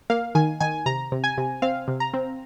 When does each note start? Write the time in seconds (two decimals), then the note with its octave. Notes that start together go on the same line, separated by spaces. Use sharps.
0.10 A#3 F5
0.35 D#3 G#5
0.60 D#3 G#5
0.86 C3 A#5
1.12 C3
1.24 G#5
1.38 C3
1.62 C4 F5
1.88 C3
2.00 A#5
2.14 C4